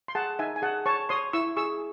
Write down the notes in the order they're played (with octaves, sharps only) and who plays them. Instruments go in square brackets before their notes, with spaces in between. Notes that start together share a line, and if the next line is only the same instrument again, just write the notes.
[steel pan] C6
G#4 F#5 A5
D#4 E5 G#5
G#5
G#4 F#5 A5
C#5 A5 C#6
C#5 C6 D#6
E4 C#6 E6
G#4 C#6 E6